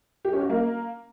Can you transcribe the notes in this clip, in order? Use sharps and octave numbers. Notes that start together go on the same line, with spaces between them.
G4
C#4
F#4
A#3